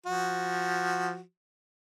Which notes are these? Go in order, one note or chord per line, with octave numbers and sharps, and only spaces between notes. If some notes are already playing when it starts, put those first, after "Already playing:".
F3 F#4